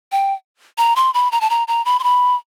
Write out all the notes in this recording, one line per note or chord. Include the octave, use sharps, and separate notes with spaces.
G5
A#5
C6
B5
A#5
A5
A#5
A#5
B5
C6
B5